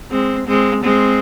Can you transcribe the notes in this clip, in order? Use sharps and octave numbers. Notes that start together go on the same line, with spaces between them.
G#3 C4
G#3 C4
G#3 C4